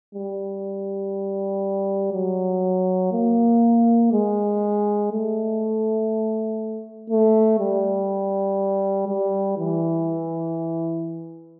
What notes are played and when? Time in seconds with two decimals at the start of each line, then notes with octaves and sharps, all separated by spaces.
0.15 G3
2.13 F#3
3.12 A#3
4.12 G#3
5.12 A3
7.10 A3
7.59 G3
9.08 G3
9.58 E3